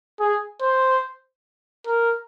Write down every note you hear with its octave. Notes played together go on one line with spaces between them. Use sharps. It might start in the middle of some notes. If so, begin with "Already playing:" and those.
G#4
C5
A#4